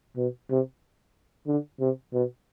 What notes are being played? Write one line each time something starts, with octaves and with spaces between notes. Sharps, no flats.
B2
C3
D3
C3
B2